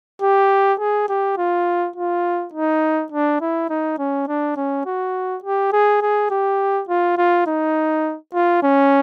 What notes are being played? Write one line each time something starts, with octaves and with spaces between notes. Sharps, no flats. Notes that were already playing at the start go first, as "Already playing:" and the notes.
G4
G#4
G4
F4
F4
D#4
D4
E4
D#4
C#4
D4
C#4
F#4
G4
G#4
G#4
G4
F4
F4
D#4
F4
C#4